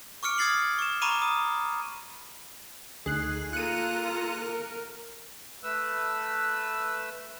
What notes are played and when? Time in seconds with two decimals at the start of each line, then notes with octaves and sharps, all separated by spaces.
0.23 C#6 D6 F6 C#7 D7
0.38 D#6 G#6 A6 C7 F#7
0.79 C#6 E7
1.02 A#5 B5 C#6 D6 D#7 E7
1.22 D#6
3.06 D2 A3 D#4 G#4 F#6 C7
3.53 A#3 F4 A4 A#5 F#6 C#7 D#7
4.40 A#4
5.64 A3 B4 E6